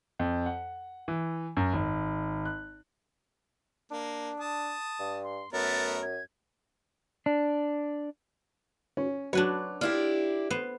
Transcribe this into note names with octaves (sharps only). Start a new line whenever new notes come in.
F2
F#5
E3
F#2
G#1
F#6
A#3 D4
A5 D#6
G2
C6
F#2 A3 B3 A#4 A6
G#6
D4
C#4
F#3 D4 B4 C#5
D4 E4 F4 G4
B3 C5